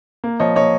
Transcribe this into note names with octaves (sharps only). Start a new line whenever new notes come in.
A#3
F3 C#5 D#5
A#3 C#5 D#5